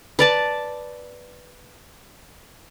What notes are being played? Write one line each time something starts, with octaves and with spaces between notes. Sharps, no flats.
B4 D5 A5